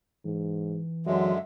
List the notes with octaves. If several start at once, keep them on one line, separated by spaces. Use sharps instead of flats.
G#2 E3
F#2 D3 F#3 G#3 E5